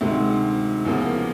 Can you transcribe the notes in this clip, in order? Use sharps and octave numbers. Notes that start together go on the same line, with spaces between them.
D2 C3 D#3 G#3
E2 C#3 F3 A#3